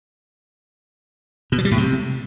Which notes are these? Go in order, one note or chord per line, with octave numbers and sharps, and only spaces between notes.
B2
F#3
G3
A2
C3